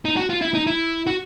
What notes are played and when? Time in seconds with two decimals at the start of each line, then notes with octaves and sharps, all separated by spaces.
0.05 D#4
0.17 F#4
0.30 F4
0.41 E4
0.54 D#4
0.67 E4
1.07 F#4